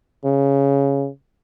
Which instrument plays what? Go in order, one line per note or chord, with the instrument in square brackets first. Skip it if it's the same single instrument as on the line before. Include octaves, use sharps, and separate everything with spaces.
[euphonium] C#3